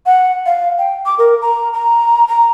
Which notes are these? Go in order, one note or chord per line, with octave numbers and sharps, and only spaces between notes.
F#5
F5
G5
D6
A#4
A#5
A#5
A#5